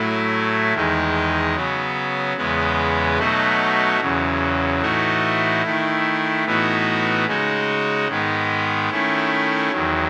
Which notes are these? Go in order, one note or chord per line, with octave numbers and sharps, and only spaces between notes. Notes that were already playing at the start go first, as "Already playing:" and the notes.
Already playing: A2 F#3 A3 E4
E2 D#3 G#3 D#4
C#3 F#3 B3
E2 C#3 G#3 B3
B2 F#3 A3 D#4 F#4
E2 C#3 F#3
A2 E3 A3 D#4 F#4
D#3 A3 E4
A2 E3 B3 D#4 F#4
C#3 G#3 D#4 F#4
G#2 D#3 G#3 B3
D#3 A3 C#4 E4
E2 D#3 F#3